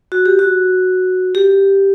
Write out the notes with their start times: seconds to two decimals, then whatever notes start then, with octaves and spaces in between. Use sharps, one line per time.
0.12 F#4
0.26 G4
0.39 F#4
1.35 G4